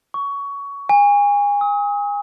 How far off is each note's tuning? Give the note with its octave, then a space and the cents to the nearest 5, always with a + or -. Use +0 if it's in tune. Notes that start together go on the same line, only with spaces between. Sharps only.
C#6 +20
G#5 -30
D#6 +40